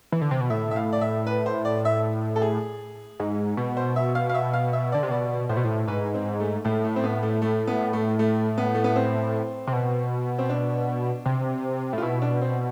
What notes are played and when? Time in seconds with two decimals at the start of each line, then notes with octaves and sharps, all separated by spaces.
0.12 E3
0.21 D3
0.31 C3
0.41 B2
0.50 A2 E5
0.71 E5
0.76 F5
0.93 D5
1.01 E5
1.27 B4
1.46 C5
1.65 D5
1.85 E5
2.36 A4
2.42 G#4
3.20 G#2
3.57 B2
3.77 C5
3.96 E5
4.15 F5
4.29 F5
4.34 E5
4.53 F5
4.73 E5
4.92 D3 D5
5.03 C3
5.11 B2 D5
5.49 A2 C5
5.57 B2
5.64 A2
5.87 G#2 B4
6.14 C4
6.40 A3
6.64 A2 A3
6.84 A3
6.96 C4
7.04 B3
7.23 A3
7.42 A3
7.67 B3
7.93 A3
8.19 A3
8.58 B3
8.75 A3
8.84 B3
8.96 C4
9.67 C3
9.73 B2
10.39 C4
10.50 D4
11.26 C3
11.93 A2
11.98 F4
12.02 B2 E4
12.22 D4
12.41 C4